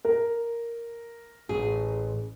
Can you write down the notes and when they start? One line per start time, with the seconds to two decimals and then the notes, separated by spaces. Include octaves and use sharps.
0.05 A#4
1.49 A1 G#4